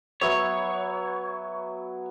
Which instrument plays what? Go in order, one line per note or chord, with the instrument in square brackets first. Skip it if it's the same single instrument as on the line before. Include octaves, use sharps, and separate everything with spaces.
[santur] F#3 B3 E5 [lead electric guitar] C#5